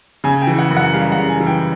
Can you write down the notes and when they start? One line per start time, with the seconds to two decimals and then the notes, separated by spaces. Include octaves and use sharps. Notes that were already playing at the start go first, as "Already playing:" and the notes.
0.24 C#3 G#5
0.42 G5
0.47 E3
0.59 F#5
0.70 F#2
0.77 F#5
0.93 G3 F5
1.12 C#3 F#5
1.29 G#5
1.40 E3
1.47 G5